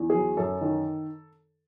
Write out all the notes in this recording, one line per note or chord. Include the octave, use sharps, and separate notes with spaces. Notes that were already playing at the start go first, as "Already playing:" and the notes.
Already playing: E2
F#3 G#4
F#2 A4
D#3